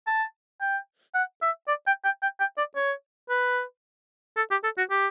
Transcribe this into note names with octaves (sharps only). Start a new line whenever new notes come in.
A5
G5
F#5
E5
D5
G5
G5
G5
G5
D5
C#5
B4
A4
G4
A4
F#4
G4